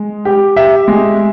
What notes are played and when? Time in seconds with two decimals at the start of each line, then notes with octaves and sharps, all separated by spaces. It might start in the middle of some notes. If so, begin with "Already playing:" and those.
Already playing: G#3
0.25 G4
0.56 G4 E5
0.88 G#3